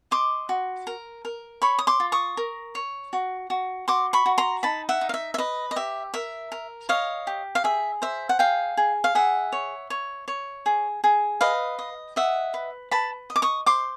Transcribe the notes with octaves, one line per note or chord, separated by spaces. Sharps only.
D#5 C6 D6
F#4
A#4
A#4
C#5 B5 C#6
D#6
C6 D6
F4
C#6 D#6
A#4
C#5
F#4
F#4
F#4 C6 D6
B5 C#6
F#4
A#5 C6
D#4 A5 B5
E5 F#5
D#4
F5
E5
E5
B4 D#5
D#5
G4 E5
A#4 E5
A#4
C#5 D#5 F5
G4
F5
G#4 E5
C5 E5
F#5
G#4 F5 G5
G#4
F5
G#4 E5 F#5
C#5
C#5
C#5
G#4
G#4
B4 D#5 F5
D#5
D#5 E5 F#5
B4
B4 A5 B5
D#5
D6
C#6 D#6
C5 C6 D6